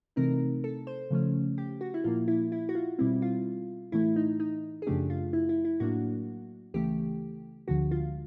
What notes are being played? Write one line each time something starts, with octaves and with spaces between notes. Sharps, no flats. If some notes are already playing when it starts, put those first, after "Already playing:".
C3 E3 A3 C4 D#4 A#4
A4
C5
C#3 F3 A3 C#4
G4
F#4
E4
A#2 F3 A#3 F4
E4
E4
F#4
F4
B2 G3 C4 E4
F4
A2 E3 A3 E4
D#4
D#4
G#4
F#2 C#3 F3 A3 D4 G4
F4
E4
E4
E4
A2 F#3 A#3 D4 F#4
C#2 C#3 E3 A3 G4
D2 D3 F3 G#3 F#4
F4